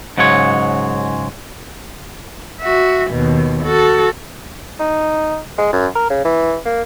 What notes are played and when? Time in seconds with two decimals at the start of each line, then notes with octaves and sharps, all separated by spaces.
0.18 G#2 C#3 F#3 G#3 C#5
2.61 F#4 E5
3.11 D#2 B2
3.64 F#4 A4
4.80 D#4
5.58 G#3
5.73 F#2
5.95 A#4
6.10 C#3
6.25 E3
6.65 A#3